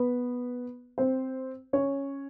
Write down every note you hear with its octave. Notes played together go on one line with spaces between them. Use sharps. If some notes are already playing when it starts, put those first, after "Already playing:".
Already playing: B3 B4
C4 C5
C#4 C#5